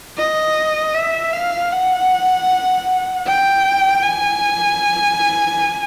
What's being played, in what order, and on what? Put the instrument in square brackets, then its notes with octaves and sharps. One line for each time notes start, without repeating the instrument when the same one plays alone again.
[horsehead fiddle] D#5
E5
F5
F#5
G5
G#5